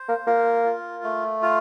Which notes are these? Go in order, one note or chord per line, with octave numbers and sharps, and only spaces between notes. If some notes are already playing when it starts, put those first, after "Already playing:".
Already playing: C5
A#3
A#3 F4
F4
A3
F4